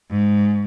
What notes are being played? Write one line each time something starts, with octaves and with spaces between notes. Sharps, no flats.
G#2